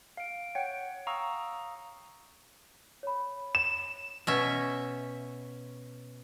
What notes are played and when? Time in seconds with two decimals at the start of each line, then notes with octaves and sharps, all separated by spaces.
0.17 F5 D7
0.55 C#5 F#5 G5
1.07 F5 A#5 C#6 D#6 E6
3.03 C#5 B5
3.55 E7
4.27 B2 C#4 E5